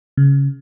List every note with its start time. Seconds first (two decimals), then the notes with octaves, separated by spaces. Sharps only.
0.17 C#3